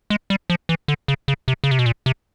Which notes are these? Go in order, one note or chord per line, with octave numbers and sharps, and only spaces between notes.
G#3
G3
F3
E3
D3
C#3
C#3
C3
C#3
C3
B2
A#2
C3